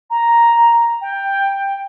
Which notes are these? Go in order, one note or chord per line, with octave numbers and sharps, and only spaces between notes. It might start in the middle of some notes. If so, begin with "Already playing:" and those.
A#5
G5